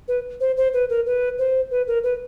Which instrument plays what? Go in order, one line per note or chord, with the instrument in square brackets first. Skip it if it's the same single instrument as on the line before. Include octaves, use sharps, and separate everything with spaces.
[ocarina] B4
C5
C5
B4
A#4
B4
C5
B4
A#4
B4